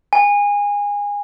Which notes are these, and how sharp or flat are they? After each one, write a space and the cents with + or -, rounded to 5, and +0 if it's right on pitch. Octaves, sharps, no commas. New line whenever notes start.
G#5 -25